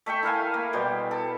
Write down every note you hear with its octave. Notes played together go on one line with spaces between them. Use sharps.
A3 E5 G5 C#6
E4 A#4 F5 G#5
A#3
B2 G3 C5
A4